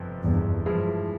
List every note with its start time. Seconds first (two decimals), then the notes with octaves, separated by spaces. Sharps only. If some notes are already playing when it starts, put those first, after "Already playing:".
Already playing: G1 F2 C3 F3
0.24 E2 G2
0.66 G2 F3 G#3 E4